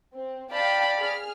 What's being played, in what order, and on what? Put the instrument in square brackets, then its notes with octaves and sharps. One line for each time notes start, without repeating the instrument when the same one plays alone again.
[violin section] C4
[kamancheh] D5 B5 [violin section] F5 G5 A5
[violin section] G#4 F6